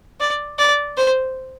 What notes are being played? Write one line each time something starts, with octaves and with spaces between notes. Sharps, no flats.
D5
D5
C5